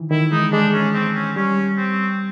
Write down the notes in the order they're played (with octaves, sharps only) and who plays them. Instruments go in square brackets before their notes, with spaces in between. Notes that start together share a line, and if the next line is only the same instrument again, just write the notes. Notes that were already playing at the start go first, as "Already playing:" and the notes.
Already playing: [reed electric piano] D#3 E3
[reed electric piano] D#3 [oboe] E4
[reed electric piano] G#3 [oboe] D#4
[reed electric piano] G#3 [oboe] D4
[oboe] C#4
C4
C#4
[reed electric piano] G3 [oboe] C#4
[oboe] C4